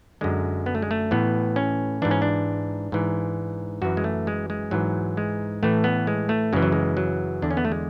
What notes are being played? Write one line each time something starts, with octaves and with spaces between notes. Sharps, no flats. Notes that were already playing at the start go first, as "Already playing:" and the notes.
F#2 D3 G#3
B3
A3
G#3
A3
A2 E3 B3
C#4
G#2 E3 D4
C#4
D4
G#2 E3
F#2 E3 F#4
G#3
A3
G#3
G#3
G#2 E3 F#3
G#3
A2 E3 A3
B3
G#3
A3
F#2 C#3 E3 G#3
F#3
G#3
F#3
E2 D3 D4
C#4
B3
A3
G#3